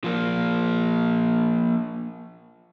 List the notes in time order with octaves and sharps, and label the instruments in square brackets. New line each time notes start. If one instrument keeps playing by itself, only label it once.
[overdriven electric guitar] F3 A#3